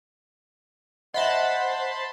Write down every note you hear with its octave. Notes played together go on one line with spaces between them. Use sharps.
C5 D#5 E5 F#5 A5 B5 C6